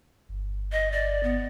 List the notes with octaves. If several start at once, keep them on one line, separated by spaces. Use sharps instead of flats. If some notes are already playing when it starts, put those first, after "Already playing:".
G1
D#5
D5
B3